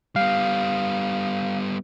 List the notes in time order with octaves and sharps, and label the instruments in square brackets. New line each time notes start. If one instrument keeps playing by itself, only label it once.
[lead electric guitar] G3 B3 [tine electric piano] F5